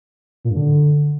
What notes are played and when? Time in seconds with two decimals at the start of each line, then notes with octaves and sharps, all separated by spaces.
0.45 A#2
0.50 G2
0.56 D3